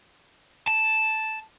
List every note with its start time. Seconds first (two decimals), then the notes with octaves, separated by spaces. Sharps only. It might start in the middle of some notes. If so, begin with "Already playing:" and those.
0.67 A5